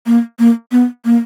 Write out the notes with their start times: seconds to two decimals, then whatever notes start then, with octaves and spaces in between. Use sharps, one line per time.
0.06 A#3
0.39 A#3
0.72 B3
1.05 A#3